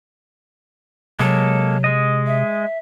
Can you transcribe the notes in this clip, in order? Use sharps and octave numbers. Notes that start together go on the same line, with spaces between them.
C3 F#3 G#3 A#3 A4
G#3 D#5
E5